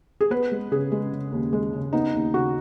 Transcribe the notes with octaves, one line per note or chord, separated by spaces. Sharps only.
G#4
B3 B4
G#3
C#3 G#4
G#3
C#3
D#2
G#3
C#3
B3 D#4
D#2
C#3 F#4